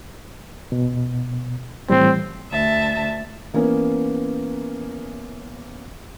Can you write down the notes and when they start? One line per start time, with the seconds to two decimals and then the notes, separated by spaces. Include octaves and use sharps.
0.72 B2
1.90 A2 E3 G3 C4
2.52 D2 E5 A5
3.54 E3 A#3 B3 C#4 A#4 B4